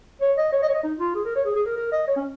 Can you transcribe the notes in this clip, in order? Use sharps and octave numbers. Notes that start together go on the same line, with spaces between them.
C#5
D#5
C#5
D#5
C#5
D#5
D#4
F4
G#4
A#4
C#5
G#4
G#4
A#4
A#4
D#5
C#5
C#4